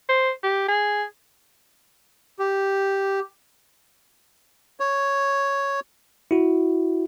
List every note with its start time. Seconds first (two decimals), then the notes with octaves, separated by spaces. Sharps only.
0.09 C5
0.43 G4
0.68 G#4
2.39 G4
4.80 C#5
6.31 E4 F#4